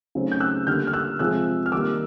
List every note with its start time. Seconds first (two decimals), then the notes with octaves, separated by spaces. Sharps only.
0.15 C#3 F#3 A3 C4 D#4
0.32 G6
0.40 E6 F#6
0.67 D3 G3 A#3 F6 G6
0.87 F6
0.93 E6 F#6
1.19 C3 F3 G#3 E6 F#6
1.66 F6
1.72 D#3 G3 A#3 D#4 D6 E6